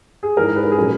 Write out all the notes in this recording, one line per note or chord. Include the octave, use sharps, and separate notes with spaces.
G#4
G#2 E3 G#3 A#4
B4
A#4
G#4
A#2 F#3 C#4 A#4